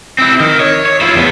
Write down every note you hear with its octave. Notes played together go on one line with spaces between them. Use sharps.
C4 E4
D#3
C#5
C#5
E4 F4
E2 B3